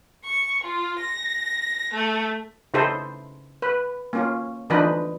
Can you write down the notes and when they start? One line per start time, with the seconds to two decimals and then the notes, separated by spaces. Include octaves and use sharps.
0.23 C#6
0.62 F4
0.98 A#6
1.92 A3
2.74 C#3 D#4 E4 G4 A4 C5
3.62 B4
4.13 A#3 C#4 F4
4.70 D3 E3 F3 D4 D#4 B4